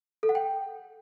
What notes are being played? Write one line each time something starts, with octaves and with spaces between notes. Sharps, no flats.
A4
F#5
G5